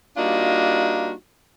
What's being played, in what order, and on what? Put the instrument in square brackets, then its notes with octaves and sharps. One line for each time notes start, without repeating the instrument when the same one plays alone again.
[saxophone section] G3 A#3 D4 D#4 F4 F#4